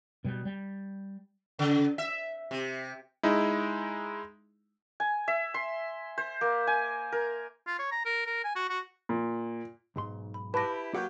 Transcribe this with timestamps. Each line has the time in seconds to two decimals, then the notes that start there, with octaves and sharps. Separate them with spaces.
0.24 B2 G3
0.45 G3
1.59 C#3
1.98 E5
2.51 C3
3.23 G#3 D#4 E4
5.00 G#5
5.28 E5
5.54 C6
6.18 C5
6.41 A#3
6.67 G#5
7.12 A#4
7.67 F4
7.79 C#5
7.92 A#5
8.06 A#4
8.26 A#4
8.44 G#5
8.55 F#4
8.69 F#4
9.09 A#2
9.96 B1 G#2 C6
10.34 B5
10.54 E4 G4 B4 A5 A#6
10.95 F#3 A#3 G4 F#5 G6